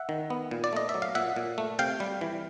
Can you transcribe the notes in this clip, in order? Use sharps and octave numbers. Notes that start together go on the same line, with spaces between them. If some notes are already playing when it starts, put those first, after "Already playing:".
Already playing: E5 F#5
D#3
B3
A#2
D5
A3 D#5
E5
F#3
F5
A#2 E5 F#5
A#2
A3
C3 F5 G5
G3
E3